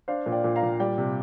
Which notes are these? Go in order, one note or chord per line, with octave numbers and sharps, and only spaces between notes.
D4 C5 F5
A#2
D5 G5
A#2
F5 A#5
A#2
G3 D5 G5
C3